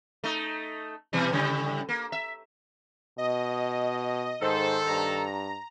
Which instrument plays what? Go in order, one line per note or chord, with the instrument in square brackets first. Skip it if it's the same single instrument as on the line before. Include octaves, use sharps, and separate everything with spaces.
[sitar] A3 D#4
B2 E3 G3
A2 C#3 G3
A#3
E5
[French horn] B2 [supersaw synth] D#5
[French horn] G#2 [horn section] D#3 A4 [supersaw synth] C5
[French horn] G2 [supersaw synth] A#5